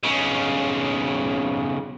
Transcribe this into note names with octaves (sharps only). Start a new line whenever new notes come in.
B1 C#3